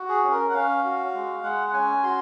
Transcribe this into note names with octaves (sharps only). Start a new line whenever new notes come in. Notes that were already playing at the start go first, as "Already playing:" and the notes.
Already playing: F#4
G#4
C#4
A#4
F#5
C#4 F5
F#4
G#3
G#3 F#5
F#5
C#4 G#5
F#4 C6